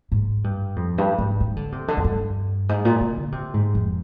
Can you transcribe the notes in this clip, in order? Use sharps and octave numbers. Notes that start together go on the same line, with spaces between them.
G#2
G2
F2
G2
G#2
D#3
D3
C3
D3
F2
G2
G#2
A#2
C3
D3
C3
G#2
F2